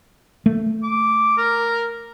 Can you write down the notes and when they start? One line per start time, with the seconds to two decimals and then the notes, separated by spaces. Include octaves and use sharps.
0.46 A3
0.83 D6
1.38 A#4